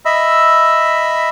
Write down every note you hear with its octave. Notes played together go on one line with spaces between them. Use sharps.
D#5 E5 B5 E6